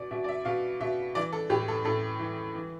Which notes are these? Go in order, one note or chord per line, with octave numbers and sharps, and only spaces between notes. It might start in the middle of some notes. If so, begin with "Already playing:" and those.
Already playing: B2 D5
B2 E5
D5
E5
B2 F5
B2 E5
E3 D5
A4
A2 G4
A4
A2 A4
E3
E3